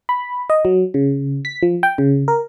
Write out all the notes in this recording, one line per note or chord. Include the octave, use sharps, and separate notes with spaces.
B5
D#5
F#3
C#3
B6
F3
G5
C#3
A#4